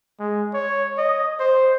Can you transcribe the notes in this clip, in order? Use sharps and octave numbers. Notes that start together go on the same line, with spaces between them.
G#3
C#5
D#5
C5